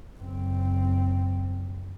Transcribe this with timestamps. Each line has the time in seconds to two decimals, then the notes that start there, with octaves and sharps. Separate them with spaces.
0.19 F#1 C4